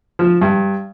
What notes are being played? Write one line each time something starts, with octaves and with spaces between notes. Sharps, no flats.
F3
G2